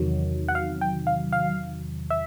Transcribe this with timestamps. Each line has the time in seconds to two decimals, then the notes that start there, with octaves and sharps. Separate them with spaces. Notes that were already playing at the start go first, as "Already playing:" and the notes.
Already playing: E2 C3 D#3 F#3
0.48 F#5
0.55 F5
0.81 G5
1.07 F5
1.32 F5
2.10 E5